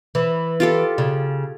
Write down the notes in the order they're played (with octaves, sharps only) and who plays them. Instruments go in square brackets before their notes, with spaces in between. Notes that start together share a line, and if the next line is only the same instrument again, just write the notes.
[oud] E3
[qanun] F4 G4 A4
[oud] C#3